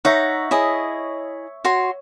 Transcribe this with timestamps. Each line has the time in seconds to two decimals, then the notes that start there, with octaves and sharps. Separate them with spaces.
0.05 D#4 C#5 E5 F#5 A#5 C#6
0.51 E4 G#4 C#5 D#5
1.65 F#4 C#5 C6